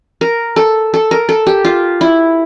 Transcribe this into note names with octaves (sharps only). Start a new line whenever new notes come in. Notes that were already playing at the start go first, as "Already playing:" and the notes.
A#4
A4
A4
A#4
A4
G4
F4
E4